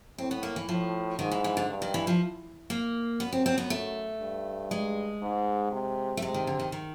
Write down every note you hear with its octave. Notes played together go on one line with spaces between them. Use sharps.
A2 C4
B3
A#3
E3
A2 F3
G#2 D#3
E3
E3
D3
G2
D#3
E3
F3
A#3
F#2 B3
C4
C4
B3
A3
G2
G#3
G#2
C3
A3
C3 G#3
D#3
D3
D#3
D#3